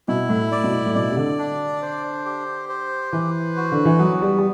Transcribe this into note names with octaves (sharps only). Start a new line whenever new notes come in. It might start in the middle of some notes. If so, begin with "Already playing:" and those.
B2 E4
A2
D5
B2
A2
A2
B2 D5
C3
D3
D4
C5
G4
C5
E3 B4
F#4
D3
E3
F#3 B3
G3
G3